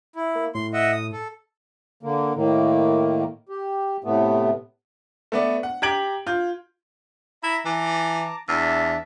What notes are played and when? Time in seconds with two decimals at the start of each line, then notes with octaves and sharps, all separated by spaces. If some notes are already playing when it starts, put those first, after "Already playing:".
0.16 E4
0.35 A#3
0.55 A2 C6
0.73 D#5 E5 F#5
0.92 D#6
1.13 A4
2.03 D3 A#3
2.35 A2 D#3 A#3
3.49 G4
4.04 A2 C3 A3 B3
5.32 A3 B3 D5
5.63 F#5
5.82 G4 A#5 G#6 D7 F#7
6.27 F4 G6
7.43 E4 E5 A#5
7.65 E3 A5 A#5 D6
8.49 E2 D4 E5 A5